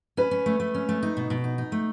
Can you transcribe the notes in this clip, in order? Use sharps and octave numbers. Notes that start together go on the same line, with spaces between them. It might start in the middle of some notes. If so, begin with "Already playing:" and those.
C#4 B4
C#4
A3
A3
C#4
A3
D#4
B2
B2
D#4
D#4
A3